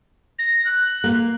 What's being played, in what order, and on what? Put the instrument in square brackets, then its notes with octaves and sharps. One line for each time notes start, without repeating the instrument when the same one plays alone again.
[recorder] A#6
F#6
[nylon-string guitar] A#3